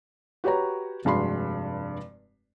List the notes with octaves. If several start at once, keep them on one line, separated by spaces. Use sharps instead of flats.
F#4 G4 B4 C#5 A#5
F1 G2 G#3 F#4 B5 C6